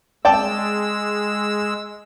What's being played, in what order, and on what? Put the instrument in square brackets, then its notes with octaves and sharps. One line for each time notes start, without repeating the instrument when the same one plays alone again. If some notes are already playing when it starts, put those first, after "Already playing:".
[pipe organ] G#3 E6 [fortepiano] D5 G5 A5